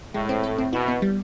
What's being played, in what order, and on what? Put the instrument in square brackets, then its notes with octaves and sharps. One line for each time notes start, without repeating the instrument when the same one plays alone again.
[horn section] A2 [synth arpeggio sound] G#3
[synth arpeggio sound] C4
A4
C4
[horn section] B2 [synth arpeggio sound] E4
[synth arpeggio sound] B3
G3